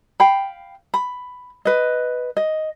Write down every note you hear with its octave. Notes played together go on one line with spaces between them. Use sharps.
F5 G5 B5
B5
B4 D#5
D#5